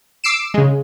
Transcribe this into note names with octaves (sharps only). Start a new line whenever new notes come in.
D6 E6 C7 D7 E7
C#3 G#3